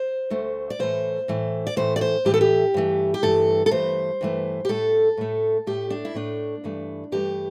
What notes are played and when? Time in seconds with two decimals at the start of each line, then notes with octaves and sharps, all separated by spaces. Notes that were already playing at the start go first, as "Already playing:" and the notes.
Already playing: C5
0.30 D2 D3 A3
0.70 D5
0.79 A2 E3 A3 C5
1.28 A2 E3 A3
1.67 D5
1.76 A2 E3 A3 C5
1.96 D5
2.01 C5
2.25 A2 E3 A3 G4
2.34 A4
2.41 G4
2.74 G2 E3 A3
3.14 G4
3.23 G2 E3 A3 A4
3.66 A4
3.71 G2 E3 A3 C5
4.21 G2 E3 A3
4.65 G4
4.69 A2 A3 A4
5.17 A2 A3
5.67 A2 A3 G4
5.90 D4
6.05 E4
6.14 A2 A3 D4
6.64 G2 E3 A3
7.12 G2 E3 A3 G4